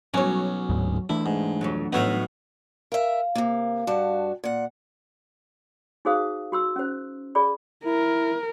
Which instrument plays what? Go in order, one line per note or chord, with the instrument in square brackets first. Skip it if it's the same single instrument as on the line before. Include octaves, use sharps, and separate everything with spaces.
[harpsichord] B1 C#4 [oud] F#3 C#5
[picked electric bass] D1 D2 G#2
[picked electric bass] E3 A3 D4 [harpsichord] E4
[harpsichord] G#2
[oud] F2 B2 F#3
[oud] A2 F#3 D#4 [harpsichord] B3 E5 F5
[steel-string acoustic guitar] A#4 E5 [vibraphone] F5
[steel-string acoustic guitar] C3 A#3
G2 F#4 A5
A#2 F#5
[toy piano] D#4 F#4 G#4 C5 F5 D#6
F#4 C6 E6
C#4 C5
G#4 D5 B5
[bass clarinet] E4 [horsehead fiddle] A#4